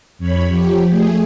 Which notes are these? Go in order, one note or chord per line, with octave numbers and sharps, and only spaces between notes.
F2 C#5 B5
F3 G4
A3 G#4